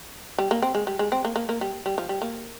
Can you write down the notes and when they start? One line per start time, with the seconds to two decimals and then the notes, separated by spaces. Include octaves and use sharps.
0.38 G3
0.51 A#3
0.62 C4
0.75 G#3
0.87 G3
0.99 G#3
1.12 C4
1.25 A#3
1.36 A#3
1.49 A#3
1.61 G3
1.86 G3
1.98 F3
2.09 G3
2.22 A#3